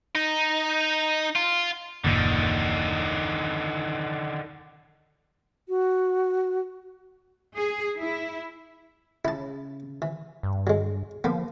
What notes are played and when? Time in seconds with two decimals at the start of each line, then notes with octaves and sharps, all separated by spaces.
0.15 D#4
1.36 F4
2.04 F#1 D#2 A#2 D3 D#3
5.69 F#4
7.55 G#4
8.00 E4
9.25 C#3 E4 A5
10.02 E3
10.43 G2
10.67 F#3 G#3
11.24 F3 A#3 B3